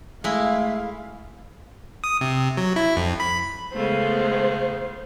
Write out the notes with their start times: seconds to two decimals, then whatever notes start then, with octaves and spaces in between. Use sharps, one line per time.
0.24 G#3 A3 E4 F5
2.04 D#6
2.21 C3
2.57 F#3
2.76 E4
2.96 F2
3.20 B5
3.74 C#3 G#3 A3 B3 C5